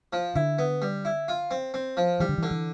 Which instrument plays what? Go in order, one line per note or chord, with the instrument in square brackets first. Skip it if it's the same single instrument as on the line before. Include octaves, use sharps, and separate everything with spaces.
[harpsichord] F3
[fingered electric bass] D3 [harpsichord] E4
[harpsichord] B3
G3
E4
F4
C4
C4
F3
[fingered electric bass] E3 [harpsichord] G3
[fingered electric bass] D3
E3
[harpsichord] D3
[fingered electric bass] E3